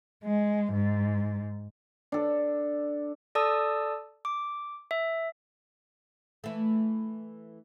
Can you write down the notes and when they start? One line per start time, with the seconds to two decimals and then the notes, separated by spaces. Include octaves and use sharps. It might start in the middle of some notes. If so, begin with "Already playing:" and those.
0.24 G#3
0.73 G#2
2.12 D4 A4
3.35 A4 D5 A5 D#6 E6
4.25 D6
4.91 E5
6.44 E3 A3